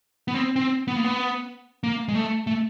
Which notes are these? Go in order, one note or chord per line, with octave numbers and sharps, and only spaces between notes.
B3
C4
C4
B3
A#3
B3
A#3
G#3
A3
A3